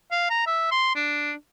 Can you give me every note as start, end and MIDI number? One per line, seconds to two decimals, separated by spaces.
0.11 0.25 77
0.30 0.42 82
0.46 0.67 76
0.71 0.95 84
0.95 1.33 62